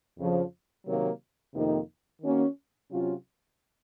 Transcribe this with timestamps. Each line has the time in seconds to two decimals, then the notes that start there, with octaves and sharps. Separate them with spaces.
0.18 F2 C#3 F3
0.85 C3 D#3 F#3 A#3
1.53 F2 C3 D#3 A#3 D#4
2.20 D#3 A#3 C#4 F#4
2.89 C3 F#3 C#4 F4